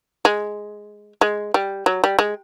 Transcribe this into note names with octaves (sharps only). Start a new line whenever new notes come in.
G#3
G#3
G3
F#3
G3
G#3